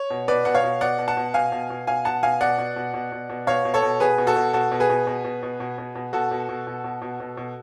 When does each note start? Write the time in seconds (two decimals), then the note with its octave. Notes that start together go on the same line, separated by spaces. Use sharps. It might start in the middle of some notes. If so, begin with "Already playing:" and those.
Already playing: C#5
0.10 B2
0.28 B2 B4 D5
0.45 B2 F#5
0.55 C#5 F5
0.64 B2
0.81 B2 D5 F#5
0.99 B2
1.08 F#5 A5
1.17 B2
1.34 B2 F5 G#5
1.52 B2
1.70 B2
1.87 B2 F5 G#5
2.05 B2 F#5 A5
2.23 B2 F5 G#5
2.41 B2 D5 F#5
2.58 B2
2.76 B2
2.94 B2
3.12 B2
3.30 B2
3.47 B2 C#5 F5
3.65 B2
3.74 A4 C#5
3.83 B2
4.00 B2 G#4 B4
4.18 B2
4.27 F#4 A4
4.36 B2
4.53 B2 F#4 A4
4.72 B2
4.80 G#4 B4
4.90 B2
5.07 B2
5.24 B2
5.43 B2
5.60 B2
5.78 B2
5.95 B2
6.13 B2 F#4 A4
6.31 B2
6.49 B2
6.67 B2
6.84 B2
7.02 B2
7.20 B2
7.37 B2